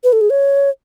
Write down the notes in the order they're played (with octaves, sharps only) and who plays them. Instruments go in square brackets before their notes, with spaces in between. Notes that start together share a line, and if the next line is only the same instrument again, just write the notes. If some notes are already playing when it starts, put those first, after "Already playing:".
[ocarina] B4
A4
G#4
C#5